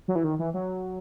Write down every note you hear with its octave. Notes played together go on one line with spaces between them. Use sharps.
F#3
E3
D#3
E3
F#3